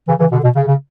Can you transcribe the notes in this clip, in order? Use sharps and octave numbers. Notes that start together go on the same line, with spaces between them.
C#3 E3
C#3 E3
B2 D3
B2
C#3
C#3